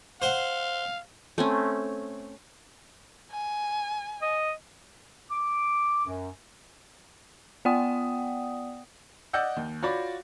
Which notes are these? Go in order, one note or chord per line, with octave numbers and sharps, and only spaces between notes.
C5 F5 F#5
A3 C4 C#4
G#5
D#5
D6
F#2
B3 D5 F#5 G5 D#6
D5 D#5 F#5 E6 G6
D#2
F4 F#4 C#5 D5 B5